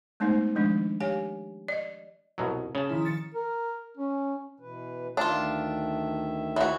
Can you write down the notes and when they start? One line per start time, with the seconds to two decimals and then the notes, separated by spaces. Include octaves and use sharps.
0.20 G#3 A3 B3 D#4 C5
0.55 D#3 F3 G#3 D4
1.01 G4 C#5 F5 G#5
1.68 D5 D#5
2.38 C2 B2 F#3
2.75 C#3 A5
2.89 D#3 F3 E4
3.05 A6 C#7
3.34 A#4
3.97 C#4
4.60 B2 E3 B4
5.17 D2 D#3 D4 F4 E5
6.56 E3 F#4